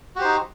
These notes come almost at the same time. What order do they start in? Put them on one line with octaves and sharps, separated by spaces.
F#4 G4 C5 D#4